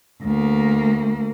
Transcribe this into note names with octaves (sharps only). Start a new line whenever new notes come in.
D2 A#3